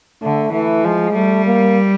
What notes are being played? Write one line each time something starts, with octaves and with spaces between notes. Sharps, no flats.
D3 A3
E3 A3
F3 G#3
G3 A3
A#3